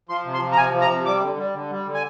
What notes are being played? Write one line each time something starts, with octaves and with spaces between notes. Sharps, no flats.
F3 C6
C3
C6
F3
A#5
C3 G#5
F3
A#5
C3
G3 D6
D3
G3
D3
G3
D3
G#5